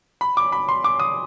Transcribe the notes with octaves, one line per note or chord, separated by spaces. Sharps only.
B5
D6
B5
C6
D6
D#6